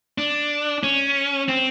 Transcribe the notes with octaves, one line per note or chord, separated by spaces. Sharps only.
D4
C#4
C4